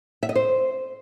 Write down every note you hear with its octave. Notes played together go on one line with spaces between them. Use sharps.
E5
D#5
C5